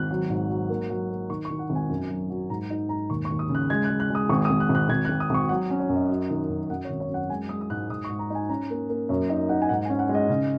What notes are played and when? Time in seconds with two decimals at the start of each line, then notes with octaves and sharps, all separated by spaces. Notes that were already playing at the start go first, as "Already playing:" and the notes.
Already playing: G#1 F#6
0.10 F#3
0.30 G#2
0.50 F#3
0.69 A#3
0.90 F#3
1.10 A#3
1.30 D#3 C#6
1.45 C#6
1.50 D#3
1.59 F#5
1.70 G#1
1.75 G#5
1.89 F#2
2.10 F#3
2.30 F#3
2.50 G#2 A#5
2.70 D#4
2.89 G#2 A#5
3.10 D#2 C#6
3.25 C#6
3.30 D#2
3.39 D#6
3.49 C#3
3.55 F#6
3.70 G#3 G#6
3.84 F#6
3.90 G#3
4.00 F#6
4.10 G#3 D#6
4.29 G#1 C#6
4.45 D#6
4.50 G#1
4.60 F#6
4.69 G#1
4.75 F#6
4.89 G#1 G#6
5.05 F#6
5.09 G#1
5.20 D#6
5.30 G#1 C#6
5.49 F#3 F#5
5.70 C#4
5.79 C#5
5.89 F#2
5.95 D#5
6.10 F#3
6.30 D#3
6.49 F#2
6.70 F#2 F#5
6.84 C#5
6.90 G#1
7.00 C#5
7.10 F#2 F#5
7.29 G#3 G#5
7.49 G#3 D#6
7.61 D#6
7.70 G#2 F#6
7.89 G#2 D#6
8.04 C#6
8.10 G#2
8.19 A#5
8.30 D#4 G#5
8.49 C#4 A#5
8.70 A#3
8.89 A#3
9.09 F#2 C#5
9.30 D#4 D#5
9.49 D#4 F#5
9.62 G#5
9.69 G#2 F#5
9.85 G#5
9.90 C#4
9.99 F#5
10.09 G#3
10.15 D#5
10.29 C#3